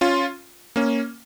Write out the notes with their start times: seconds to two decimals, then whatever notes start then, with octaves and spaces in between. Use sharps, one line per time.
0.01 C#4 F4
0.76 A#3 C#4